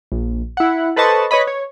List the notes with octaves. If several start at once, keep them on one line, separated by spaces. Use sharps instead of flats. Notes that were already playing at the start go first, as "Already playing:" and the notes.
A#1
E4 F#5
A4 B4 C5 D#5 A5 C#6
B4 C#5 D#5 B5
C#5